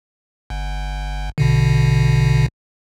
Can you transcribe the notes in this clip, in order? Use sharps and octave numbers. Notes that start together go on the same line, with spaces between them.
G1
A#1 B2 D3